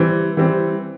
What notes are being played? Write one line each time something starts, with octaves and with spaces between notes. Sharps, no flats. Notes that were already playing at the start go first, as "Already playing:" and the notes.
Already playing: E3 G3 C4
E3 G3 C4